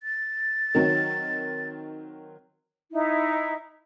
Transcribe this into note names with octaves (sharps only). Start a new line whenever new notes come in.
A6
D#3 F#3 C4
D#4 E4